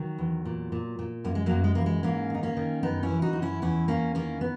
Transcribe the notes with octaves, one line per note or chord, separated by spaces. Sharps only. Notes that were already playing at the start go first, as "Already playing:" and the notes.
Already playing: D#3 F#3
E2
A#2
A#2
A#2
F#2 A#3
G#3
F#2 F#3 A#3
G#3
E3 A#3
G#3
G#2 A#3 C#4
D#3 D#4
A#3 C#4
D#3
F#2 B3 D#4
C#4 E4
E3
D#4 F#4
F#2 D#4
C#4 E4
E2 C#4 E4
E2 A#3 C#4
D#3 A#3 C#4
B3